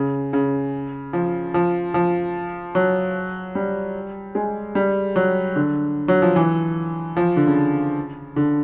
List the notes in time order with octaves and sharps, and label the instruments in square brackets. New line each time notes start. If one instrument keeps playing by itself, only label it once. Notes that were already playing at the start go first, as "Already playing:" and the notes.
Already playing: [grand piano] C#3
C#3
F3
F3
F3
F#3
G3
G#3
G3
F#3
D3
F#3
F3
E3
F3
D3
C#3
D3